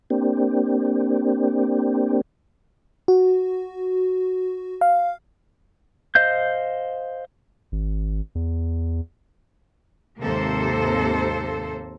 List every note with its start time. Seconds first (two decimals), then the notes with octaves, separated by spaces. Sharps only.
0.10 A#3 C4 D4 G4
3.08 F#4
4.81 F5
6.15 C5 D#5 F5 G6
7.72 G#1
8.35 E2
10.21 D#2 G#2 C3 A#3 A4 C5